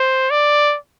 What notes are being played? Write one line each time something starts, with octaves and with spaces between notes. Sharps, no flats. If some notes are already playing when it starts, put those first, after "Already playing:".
Already playing: C5
D5